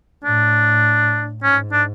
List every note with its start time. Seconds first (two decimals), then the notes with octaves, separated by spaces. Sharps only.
0.24 A2 D4
1.43 G#2 C#4
1.72 D4